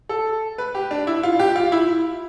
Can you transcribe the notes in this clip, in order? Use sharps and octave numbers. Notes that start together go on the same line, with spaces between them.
A4
B4
G4
D4
E4
F4
G4
F4
E4